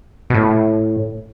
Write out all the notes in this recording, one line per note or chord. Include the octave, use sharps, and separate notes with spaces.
B2
A2